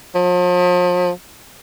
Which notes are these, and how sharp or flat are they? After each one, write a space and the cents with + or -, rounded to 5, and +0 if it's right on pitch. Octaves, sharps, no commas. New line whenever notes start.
F3 +40